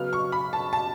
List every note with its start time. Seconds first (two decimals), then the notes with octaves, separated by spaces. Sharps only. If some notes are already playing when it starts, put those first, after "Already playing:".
Already playing: C#3 F#3 B3 F6
0.13 C#6
0.32 B5
0.53 A5
0.73 A5